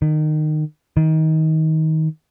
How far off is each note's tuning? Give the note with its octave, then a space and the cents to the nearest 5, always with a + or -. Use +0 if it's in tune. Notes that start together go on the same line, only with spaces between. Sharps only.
D#3 -25
D#3 +25